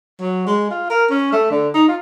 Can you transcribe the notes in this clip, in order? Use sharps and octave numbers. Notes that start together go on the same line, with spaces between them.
F#3
G#3
F4
A#4
C#4
A3
D3
D#4
F4